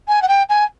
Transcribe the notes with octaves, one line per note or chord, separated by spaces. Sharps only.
G#5
F#5
G5
G#5